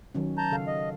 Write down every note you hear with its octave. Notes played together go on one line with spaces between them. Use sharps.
D#3 F#3 C#4
A5 A#5 G6
C#3 A4 F5
D#5